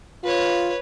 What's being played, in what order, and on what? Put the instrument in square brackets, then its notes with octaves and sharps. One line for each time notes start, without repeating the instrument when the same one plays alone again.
[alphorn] F4 [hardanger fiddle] B4 C#5